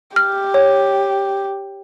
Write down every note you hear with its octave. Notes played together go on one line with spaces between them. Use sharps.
G4 F6
C#5